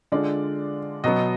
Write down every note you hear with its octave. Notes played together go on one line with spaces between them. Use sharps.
D3 G#3 D4 F4 D5
B2 F#3 B3 D#5